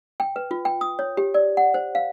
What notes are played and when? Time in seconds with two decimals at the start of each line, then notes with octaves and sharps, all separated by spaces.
0.20 G5
0.36 B4
0.51 F4
0.65 G5
0.81 D#6
0.99 C#5
1.17 G4
1.34 D5
1.57 F#5
1.74 C5
1.95 F5